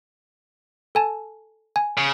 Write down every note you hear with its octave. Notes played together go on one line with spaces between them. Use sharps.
A4 G#5 A5
G#5
C#3